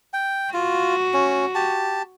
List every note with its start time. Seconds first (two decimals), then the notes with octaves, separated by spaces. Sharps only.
0.13 G5
0.54 F4 F#4
1.14 C#4
1.55 G4 A5